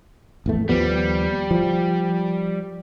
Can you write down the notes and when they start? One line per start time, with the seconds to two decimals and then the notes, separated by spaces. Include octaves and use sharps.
0.46 G#1 E2 A3
0.69 D#2 F3 G3 B3
1.51 F3